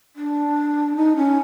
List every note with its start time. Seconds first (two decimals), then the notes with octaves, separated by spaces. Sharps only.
0.16 D4
0.96 D#4
1.16 C#4